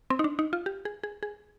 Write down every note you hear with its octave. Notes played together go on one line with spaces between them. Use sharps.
C4
D#4
D4
D#4
F4
G4
G#4
G#4
G#4